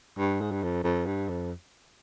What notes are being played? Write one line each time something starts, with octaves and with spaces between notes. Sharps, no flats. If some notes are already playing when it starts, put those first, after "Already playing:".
G2
G#2
G2
F2
F2
G2
F2